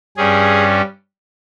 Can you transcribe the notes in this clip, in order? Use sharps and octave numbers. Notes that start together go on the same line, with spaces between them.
G2 G3 C#4 G#4